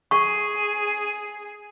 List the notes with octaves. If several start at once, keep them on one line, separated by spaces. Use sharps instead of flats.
G#4 C#6